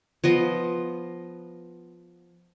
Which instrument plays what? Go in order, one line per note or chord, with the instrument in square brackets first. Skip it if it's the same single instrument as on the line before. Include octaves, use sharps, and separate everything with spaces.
[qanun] F3 B3 D#5